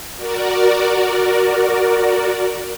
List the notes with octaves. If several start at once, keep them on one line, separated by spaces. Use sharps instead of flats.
F#4 A#4 D5